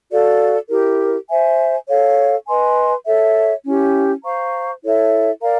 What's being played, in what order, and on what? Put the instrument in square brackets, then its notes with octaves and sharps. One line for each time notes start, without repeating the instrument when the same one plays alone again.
[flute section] F#4 A4 D5 F5
E4 G4 A#4
C5 E5 G#5
A4 C#5 F5
B4 D#5 G#5 C6
A4 C#5 E5
C#4 E4 G4
C5 F5 A#5 C#6
E4 A4 C#5 E5
A#4 D5 F5 A#5